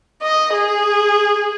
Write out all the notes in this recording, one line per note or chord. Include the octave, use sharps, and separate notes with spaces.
D#5
G#4